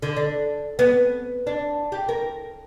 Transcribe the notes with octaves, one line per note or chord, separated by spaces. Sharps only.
D3
D4
B3
D4
G4
A#4